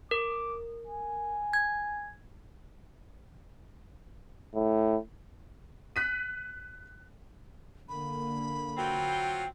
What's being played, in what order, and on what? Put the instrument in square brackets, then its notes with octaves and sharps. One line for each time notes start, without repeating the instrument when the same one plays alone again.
[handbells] A#4 [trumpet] D6
[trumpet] G#5
[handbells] G#6
[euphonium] A2
[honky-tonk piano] F#6 B6 D#7
[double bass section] D3 A#3 [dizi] B5
[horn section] F#3 C4 F4 [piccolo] G5